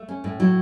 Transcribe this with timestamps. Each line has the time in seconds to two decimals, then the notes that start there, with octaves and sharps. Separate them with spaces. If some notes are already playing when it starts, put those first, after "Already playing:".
Already playing: A3
0.08 C#4
0.24 A2
0.40 F#3 E4